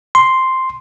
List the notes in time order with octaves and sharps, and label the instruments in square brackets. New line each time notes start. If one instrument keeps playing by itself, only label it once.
[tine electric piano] C6